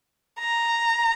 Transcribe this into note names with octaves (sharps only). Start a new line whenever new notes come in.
A#5